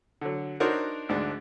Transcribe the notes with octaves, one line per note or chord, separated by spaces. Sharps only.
D3 F#3
D4 D#4 F#4 A#4 C5 C#5
D2 G#2 D4